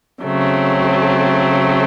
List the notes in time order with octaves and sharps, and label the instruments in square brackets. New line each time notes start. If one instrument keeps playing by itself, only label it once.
[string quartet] C#3 F#3 A3 C4